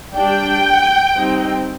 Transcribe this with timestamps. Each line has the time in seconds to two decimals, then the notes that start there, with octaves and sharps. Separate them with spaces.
0.16 G3 D4 G5
1.16 G3 C4 D#4